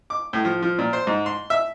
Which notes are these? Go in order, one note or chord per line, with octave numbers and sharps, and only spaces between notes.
D6
A2
F3
F3
A#2
C5
G#2
C6
E5